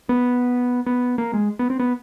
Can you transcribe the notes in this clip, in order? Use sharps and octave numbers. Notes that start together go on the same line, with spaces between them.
B3
B3
A#3
G#3
B3
C4
B3